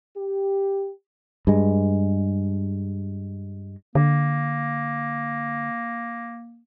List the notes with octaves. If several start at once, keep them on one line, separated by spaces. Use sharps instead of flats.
G4
G2 G#3
D3 A#3